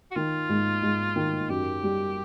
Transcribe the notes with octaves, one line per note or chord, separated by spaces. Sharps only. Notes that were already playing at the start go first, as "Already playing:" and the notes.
F#4
D#3 F4
G#2
G#2
D#3
F#2 G4
G3